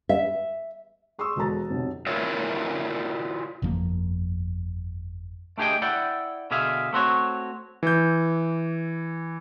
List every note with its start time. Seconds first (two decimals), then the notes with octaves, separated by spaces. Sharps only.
0.09 E5
1.18 G#4 C6 C#6 D#6 E6
1.36 E1 G#3 F#4 A4 A#5 A6
1.70 B1 F2 C3
2.07 E4 F4 A#4 C#5 D5 E5
3.62 G1 F2 F3 A#3
5.58 A3 D4 G4 G#4 D#5 G5
5.82 E4 D5 F#5 G5
6.51 B2 D3 G#4 E5 F5
6.93 A3 C4 F#4 C#5
7.83 E3 G6